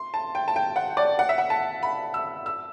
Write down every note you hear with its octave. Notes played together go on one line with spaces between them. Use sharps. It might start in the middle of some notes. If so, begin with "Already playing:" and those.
Already playing: C6
A5
G5
A5
G5
F#5
D5
F#5
E5
F#5
A5
B5
E6
E6